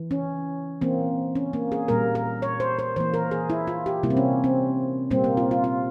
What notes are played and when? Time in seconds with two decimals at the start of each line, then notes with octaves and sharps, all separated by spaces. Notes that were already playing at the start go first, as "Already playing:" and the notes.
Already playing: E3
0.11 C#4
0.81 E3 A#3 C4
1.35 C#4
1.53 A#3
1.72 G#4
1.88 A#2 G3 A#3 A#4
2.15 A#4
2.42 C#5
2.60 C5
2.79 C5
2.96 E3 A#3 C5
3.14 A#4
3.31 G#4
3.50 E4
3.67 F4
3.86 G4
4.03 C3 G3 A#3 E4
4.10 C4
4.17 C#4
4.44 C4
5.11 A#2 G3 A#3 C4
5.24 A#3
5.37 F4
5.51 F4
5.64 F4